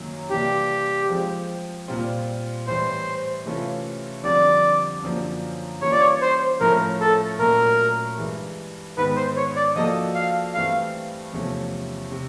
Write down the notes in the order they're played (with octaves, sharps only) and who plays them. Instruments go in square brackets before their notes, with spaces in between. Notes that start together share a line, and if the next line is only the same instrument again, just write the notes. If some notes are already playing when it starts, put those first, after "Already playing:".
Already playing: [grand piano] F#2 D#3 F#3 A#3
[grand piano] C3 E3 G3 A#3 D4 [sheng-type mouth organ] G4
[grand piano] F3 G#3 C4
A#2 G3 C4 F4
[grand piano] A2 E3 G3 [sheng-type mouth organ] C5
[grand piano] C3 E3 A3 C#4 F4
[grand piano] F2 D3 G3 [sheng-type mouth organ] D5
[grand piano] F#2 D3 F3 A#3
[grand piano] E3 G3 A#3 C#4 F4 [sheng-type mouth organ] C#5
[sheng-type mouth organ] D5
C#5
C5
[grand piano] A2 F3 A3 C#4 [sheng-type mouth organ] A#4
[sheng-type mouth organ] A4
[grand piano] A#2 F#3 A3 C#4 [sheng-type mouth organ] A#4
[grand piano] G2 E3 G#3
[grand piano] G#2 D#3 G#3 B3 [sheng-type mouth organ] B4
[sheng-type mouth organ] C5
C#5
D5
[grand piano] F3 A#3 D4 F#4 A4 [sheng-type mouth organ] D#5
[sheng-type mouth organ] F5
[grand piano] G2 E3 A3 C4 [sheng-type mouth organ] F5
[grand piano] E2 C3 F3 A3 C#4
C3